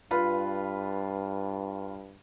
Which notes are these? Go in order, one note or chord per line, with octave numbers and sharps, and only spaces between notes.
G2 F4 B4 B5